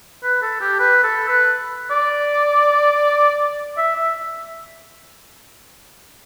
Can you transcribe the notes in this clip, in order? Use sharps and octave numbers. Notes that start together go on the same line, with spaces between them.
B4
A4
G4
B4
A4
B4
D5
E5
E5